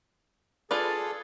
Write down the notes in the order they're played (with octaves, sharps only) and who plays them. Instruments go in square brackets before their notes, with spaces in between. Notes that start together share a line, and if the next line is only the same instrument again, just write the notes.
[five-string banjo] F4 B4 D5 [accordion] G#4 A4